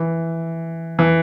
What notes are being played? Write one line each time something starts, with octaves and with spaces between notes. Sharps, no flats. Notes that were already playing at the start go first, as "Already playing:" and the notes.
Already playing: E3
E3